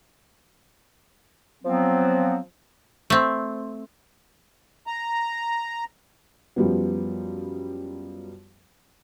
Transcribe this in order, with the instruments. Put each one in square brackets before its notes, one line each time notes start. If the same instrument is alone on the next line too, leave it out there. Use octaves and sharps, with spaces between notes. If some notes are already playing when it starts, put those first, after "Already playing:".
[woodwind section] F3 F#3 B3 C4
[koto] A3 C4
[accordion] A#5
[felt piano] F#2 F3 G3 B3